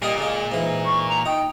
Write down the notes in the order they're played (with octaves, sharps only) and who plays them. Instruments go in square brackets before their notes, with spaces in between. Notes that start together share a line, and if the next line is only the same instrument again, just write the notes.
[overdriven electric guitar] A#2 [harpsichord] G3 A#4 D#5
[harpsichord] C#3 G#3
G#2 E3
[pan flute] C#6
A#5
[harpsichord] D#4 [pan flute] G5